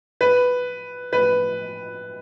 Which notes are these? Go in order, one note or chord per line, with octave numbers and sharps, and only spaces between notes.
B4
B4